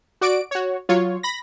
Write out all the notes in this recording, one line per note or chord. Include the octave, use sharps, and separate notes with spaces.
F#4 D5 D7
F#4 C#5
F#3 F4 C#5
B5 A#6